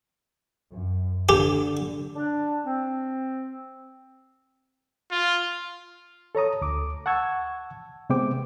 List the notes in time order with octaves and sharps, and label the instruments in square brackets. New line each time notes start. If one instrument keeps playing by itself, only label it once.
[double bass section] F#2
[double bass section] D3 [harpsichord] G4
[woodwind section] D4
C4
[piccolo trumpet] F4
[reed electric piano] A4 C#5 A#5 D#6
D2 D6
F#5 A5 C#6 E6 G#6
C3 G#3 B3 C5 G5 D6